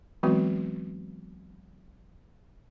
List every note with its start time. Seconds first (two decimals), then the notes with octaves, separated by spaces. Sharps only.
0.23 E3 F#3 G#3 B3 C4 F#4